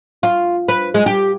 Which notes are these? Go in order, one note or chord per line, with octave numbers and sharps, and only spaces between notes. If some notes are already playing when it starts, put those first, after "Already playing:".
F4
B4
G#3
G4